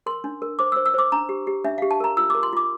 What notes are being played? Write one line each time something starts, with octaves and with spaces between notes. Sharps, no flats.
A#4 C6
D4
A#4
C5 D6
C5 E6
E6
C5 D6
D4 A#5
G4
G4
D4 E5
G4 F5
A5
A#4 A#5
F4 E6
A#4 D6
C6
F4 D6